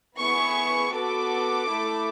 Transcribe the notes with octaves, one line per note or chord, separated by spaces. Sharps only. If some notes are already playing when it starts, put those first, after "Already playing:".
B3 E4 G#4 C#6
B3 F#4 A4 D6
A3 E4 A4